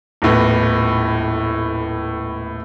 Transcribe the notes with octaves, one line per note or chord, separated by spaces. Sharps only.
D#1 A2 B3